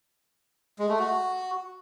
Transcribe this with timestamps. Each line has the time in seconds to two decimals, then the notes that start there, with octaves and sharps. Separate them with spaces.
0.79 G#3
0.89 A3
0.99 F#4